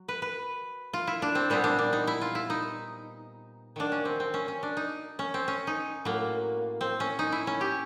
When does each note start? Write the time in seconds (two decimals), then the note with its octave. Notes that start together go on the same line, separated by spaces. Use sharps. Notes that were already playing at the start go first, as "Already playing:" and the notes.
Already playing: F#3
0.08 B4
0.22 B4
0.93 F4
1.07 E4
1.22 D4
1.35 C4
1.50 A#2 G3 B3 C4
1.64 D4
1.79 D4
1.93 D#4
2.07 E4
2.21 F4
2.35 E4
2.50 D#4
3.76 D#3 F#3 A#3 D4
3.92 C#4
4.05 C4
4.20 C4
4.34 C#4
4.48 C#4
4.63 D4
4.77 D#4
5.19 C#4
5.34 C4
5.48 C#4
5.67 D#4
6.05 A2 F#3 A#3
6.81 C4
7.00 C#4
7.19 D#4
7.32 E4
7.47 C#4
7.61 G4